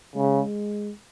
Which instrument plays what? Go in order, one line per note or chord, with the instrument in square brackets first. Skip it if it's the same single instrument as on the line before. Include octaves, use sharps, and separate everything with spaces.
[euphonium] C#3 [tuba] G#3